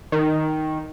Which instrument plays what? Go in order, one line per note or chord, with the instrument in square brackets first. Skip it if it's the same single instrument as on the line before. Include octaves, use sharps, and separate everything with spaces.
[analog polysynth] D#3